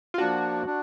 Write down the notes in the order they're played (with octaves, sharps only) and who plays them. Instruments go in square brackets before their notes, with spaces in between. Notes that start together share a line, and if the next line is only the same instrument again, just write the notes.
[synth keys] F4
[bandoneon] F3 A#3 D4 [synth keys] F#4
[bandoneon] D4